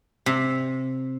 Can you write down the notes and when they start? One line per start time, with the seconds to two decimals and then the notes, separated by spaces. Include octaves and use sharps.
0.26 C3